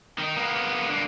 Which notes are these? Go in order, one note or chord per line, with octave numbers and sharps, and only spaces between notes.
D#3 D#4
A#3 B3
D3 A#3